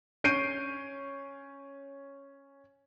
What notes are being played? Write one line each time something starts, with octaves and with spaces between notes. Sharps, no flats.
C#4 G6 C7 D7 D#7